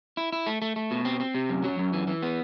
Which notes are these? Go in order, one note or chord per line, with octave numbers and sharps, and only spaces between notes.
E4
E4
A3
A3
A3
B2
C4
C4
C3
F#2
F#3
F#2
E3
E3
B3